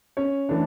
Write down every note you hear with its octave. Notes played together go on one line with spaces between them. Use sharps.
C#4 C#5
E3 A3 D4